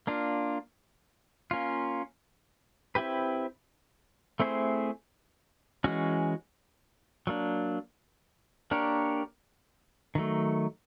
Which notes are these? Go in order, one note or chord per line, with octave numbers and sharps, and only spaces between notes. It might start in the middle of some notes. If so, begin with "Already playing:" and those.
A#3 D4 F4
A#3 C#4 F4
C4 E4 G4 B4
A3 C4 E4 G#4 C5
E3 G#3 C#4 F#4
F#3 A#3 D4
A#3 D4 G4 A#4 C#5
D#3 F#3 A3